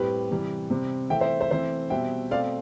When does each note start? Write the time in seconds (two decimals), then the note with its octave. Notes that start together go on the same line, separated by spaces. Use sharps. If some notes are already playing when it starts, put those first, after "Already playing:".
Already playing: A2 G3 C4 G4 B4
0.30 C3 E3 G3
0.70 C3 G3 C4
1.10 E3 A3 C4 E5 G5
1.21 C5 E5
1.40 C5 E5
1.51 E3 A3 C4 C5 E5
1.90 B2 G3 C4 E5 G5
2.31 B2 A3 C4 D5 F5